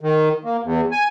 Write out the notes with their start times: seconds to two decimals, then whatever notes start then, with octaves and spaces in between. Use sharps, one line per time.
0.01 D#3
0.45 A#3
0.63 E2
0.92 G#5